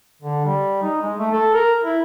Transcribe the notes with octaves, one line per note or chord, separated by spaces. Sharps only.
D3
G3
D#4
G#3
A3
A4
A#4
E4